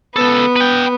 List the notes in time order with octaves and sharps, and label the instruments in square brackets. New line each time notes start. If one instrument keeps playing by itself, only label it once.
[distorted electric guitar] C#2 A4 [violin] B3
[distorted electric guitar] B4 G5